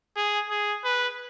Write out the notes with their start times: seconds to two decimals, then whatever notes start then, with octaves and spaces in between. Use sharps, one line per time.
0.16 G#4
0.50 G#4
0.84 B4